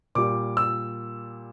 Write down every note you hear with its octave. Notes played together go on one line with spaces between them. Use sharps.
A#2 G3 D6
E6